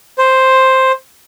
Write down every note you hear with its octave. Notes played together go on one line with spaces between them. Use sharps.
C5